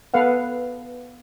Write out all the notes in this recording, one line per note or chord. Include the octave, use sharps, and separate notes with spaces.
B3 A4 B4 F5 F#5